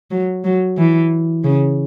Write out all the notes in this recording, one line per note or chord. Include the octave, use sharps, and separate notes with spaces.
F#3
F#3
E3
C#3